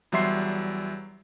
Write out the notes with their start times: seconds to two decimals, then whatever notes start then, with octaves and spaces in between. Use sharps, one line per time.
0.12 E2 F#3 G3 E5 C6 C7